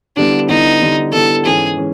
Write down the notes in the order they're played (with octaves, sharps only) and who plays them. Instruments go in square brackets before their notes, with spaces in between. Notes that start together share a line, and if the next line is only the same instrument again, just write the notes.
[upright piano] D3 G3 B3 E4 [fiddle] D4
[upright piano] D3 G3 B3 E4 [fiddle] D#4
[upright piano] D3 G3 B3 E4
[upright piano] D3 G3 B3 E4 [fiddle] A4
[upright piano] G#2 E3 G#3 C#4 [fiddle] G#4
[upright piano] E3 G#3 C#4